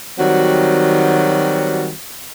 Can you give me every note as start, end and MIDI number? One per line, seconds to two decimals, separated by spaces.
0.19 1.91 51
0.19 1.91 54
0.19 1.91 55
0.19 1.91 60
0.19 1.91 66